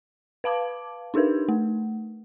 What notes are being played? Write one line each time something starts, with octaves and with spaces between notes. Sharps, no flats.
B4 F5 A5 D6
D4 D#4 G4 A#4 B4
A3